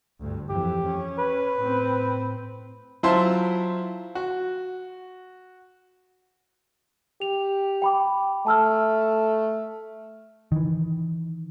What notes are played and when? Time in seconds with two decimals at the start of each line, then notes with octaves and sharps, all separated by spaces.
0.20 D2 G2
0.49 F2 E3 G4
0.85 C#4
1.19 B4
1.57 A2 C4
3.03 F#3 E4 F4 C5 A5 C6
4.15 F#4
7.22 G4 F7
7.82 G5 B5 D6
8.46 A3 A5 E6 F6
10.52 D#3 E3